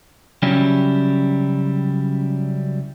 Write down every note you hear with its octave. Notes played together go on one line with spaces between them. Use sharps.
C#3 F#3 G3 C#4 E4 G4